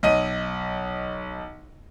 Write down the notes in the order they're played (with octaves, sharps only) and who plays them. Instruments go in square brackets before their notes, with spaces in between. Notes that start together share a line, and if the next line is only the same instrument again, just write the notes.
[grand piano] B1 D#5 D#7